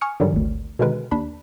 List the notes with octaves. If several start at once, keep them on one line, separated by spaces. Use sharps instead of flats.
G#5 C#6 D#6 F6 C#7
G2 D3 D#3 F#3 G3
G#1 D2
B2 D3 D#3 G#3 A#4 B4
D#2 D4 B5